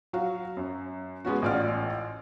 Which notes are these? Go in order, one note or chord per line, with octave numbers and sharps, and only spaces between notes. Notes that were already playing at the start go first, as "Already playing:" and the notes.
F#3 F#4 F5
F#2
G#3 B3 C#4 F#4
A1 F4 D5 F#5 F6